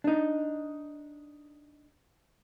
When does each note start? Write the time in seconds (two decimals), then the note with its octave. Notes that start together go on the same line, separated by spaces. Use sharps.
0.04 D4 D#4